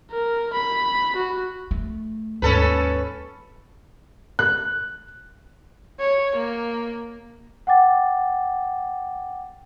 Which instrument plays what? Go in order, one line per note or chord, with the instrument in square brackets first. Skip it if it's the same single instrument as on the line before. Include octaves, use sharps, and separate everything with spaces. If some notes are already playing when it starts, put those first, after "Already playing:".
[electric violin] A#4
B5
F#4
[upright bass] A3
[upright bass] D#2 G#2 [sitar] C#4 A4 B4
[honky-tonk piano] F#6
[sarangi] C#5
A#3
[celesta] F#5 G5 D6 A6